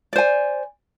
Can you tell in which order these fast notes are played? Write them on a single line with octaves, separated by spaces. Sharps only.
D5 C5 G#5